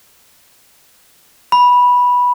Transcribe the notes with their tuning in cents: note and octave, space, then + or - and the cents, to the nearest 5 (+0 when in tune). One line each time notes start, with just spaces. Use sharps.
B5 -10